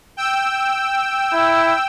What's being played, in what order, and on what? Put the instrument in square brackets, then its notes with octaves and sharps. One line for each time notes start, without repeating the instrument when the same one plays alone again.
[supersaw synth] G5 E6
[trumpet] E4